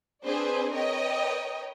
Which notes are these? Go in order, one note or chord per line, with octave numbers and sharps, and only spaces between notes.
C4 D4 G#4 B4 C5 D5
A#4 B4 C#5 D#5 G5